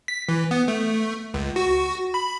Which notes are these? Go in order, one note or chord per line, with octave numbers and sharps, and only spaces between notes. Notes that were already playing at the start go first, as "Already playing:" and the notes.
B6
E3
B3
A3
C#2
F#4
B5